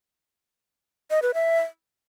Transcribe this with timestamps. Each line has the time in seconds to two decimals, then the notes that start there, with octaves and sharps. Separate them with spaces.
1.11 D#5
1.22 B4
1.34 E5